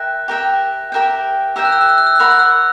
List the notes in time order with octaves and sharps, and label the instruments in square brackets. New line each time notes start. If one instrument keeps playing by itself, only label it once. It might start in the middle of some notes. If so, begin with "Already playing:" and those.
Already playing: [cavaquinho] A#4 E5 G5 [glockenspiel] F#6
[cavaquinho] G4 A#4 E5 G5
G4 A#4 E5 G5
[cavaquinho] G4 A#4 E5 G5 [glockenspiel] E6
[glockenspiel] F#6
E6
F#6
E6
F#6
E6
F#6
[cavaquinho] A#4 C#5 F#5 B5 [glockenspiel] E6
[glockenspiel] F#6
E6